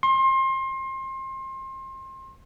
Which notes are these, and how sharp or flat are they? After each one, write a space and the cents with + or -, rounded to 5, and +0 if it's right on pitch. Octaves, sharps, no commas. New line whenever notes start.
C6 +30